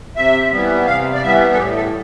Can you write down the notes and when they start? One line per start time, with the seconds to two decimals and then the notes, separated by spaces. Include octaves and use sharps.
0.16 C3 E5
0.51 E3 G3 B3
0.86 C3 F5
1.14 D5
1.22 E3 G3 B3 E5
1.53 A4
1.57 A2 G4
1.76 A4